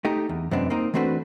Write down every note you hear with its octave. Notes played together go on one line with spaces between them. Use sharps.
A3 D#4 G4
E2
F#2 C3 G#3 B3 C4 D4
A#3 C4 D#4
E3 A3 C4 D4 F#4 B4